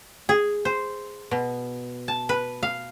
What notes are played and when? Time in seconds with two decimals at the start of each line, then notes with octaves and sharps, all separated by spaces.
0.29 G#4
0.65 C5
1.31 B2
2.08 A5
2.29 B4
2.63 F5